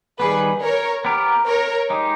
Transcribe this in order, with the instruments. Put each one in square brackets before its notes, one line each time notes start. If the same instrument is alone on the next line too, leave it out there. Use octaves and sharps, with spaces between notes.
[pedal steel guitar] D#3 G3 B3 [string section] G#4 B4
[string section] A#4 C#5
[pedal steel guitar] B3 G4 A#4
[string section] A#4 C#5
[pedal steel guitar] G#3 D#4 G4